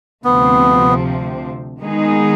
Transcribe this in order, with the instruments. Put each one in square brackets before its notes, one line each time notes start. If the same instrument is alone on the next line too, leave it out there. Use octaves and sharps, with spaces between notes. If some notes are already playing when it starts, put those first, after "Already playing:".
[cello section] D2 C3 F3 C4 [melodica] B3
[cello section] D#3 G#3 B3 D#4 G#4